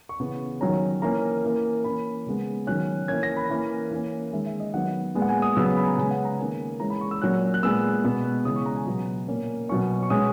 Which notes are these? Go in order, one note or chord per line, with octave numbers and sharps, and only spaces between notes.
C#6
C#3 E3 B3
D#3 F#3 C#4 A#5
E3 A#3 C#4 A#5
E3 A#3 C#4
E3 A#3 C#4 B5
C#3 G#3 B3
D#3 F#3 C#4 F#6
E3 A#3 C#4 G#6
A#6
B5
E3 A#3 C#4
E3 A#3 C#4
D#3 G#3 C#4 E5
E5
D#5
D#3 F#3 B3 F#5
A#2 G#3 B3
F#5
G#5
D#6
C#3 F#3 B3 E6
D#6
B5
G#5
A#5
C#3 G#3 B3 G#5
F#5
A#5
D#3 A#3 C#4 G#5
E3 G#3 C#4 A#5
B5
C#6
E6
A#2 F#3 A#3 C#4 F#6
F#6
A#2 G#3 B3 E6
B2 G#3 B3
C#3 E3 G#3 D#6
C#6
A#5
G#5
B2 F#3 B3 A#5
A#2 A#3 C#4
B2 F#3 C#4 C#6
C#6
B2 G#3 C#4 D#6